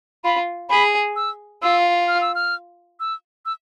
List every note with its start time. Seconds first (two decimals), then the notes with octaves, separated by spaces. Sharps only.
0.24 F4 B5
0.69 G#4 B5
1.16 E6
1.62 F4 E6
2.08 F6
2.21 E6
2.35 F6
3.00 E6
3.46 E6